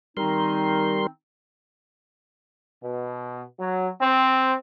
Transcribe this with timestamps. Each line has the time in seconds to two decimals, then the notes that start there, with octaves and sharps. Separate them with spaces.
0.17 D#3 G3 C4 D#4 A#4 C6
2.82 B2
3.59 F#3
4.01 C4